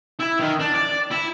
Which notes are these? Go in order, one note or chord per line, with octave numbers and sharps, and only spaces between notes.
E4
D#3
D4
D5
E4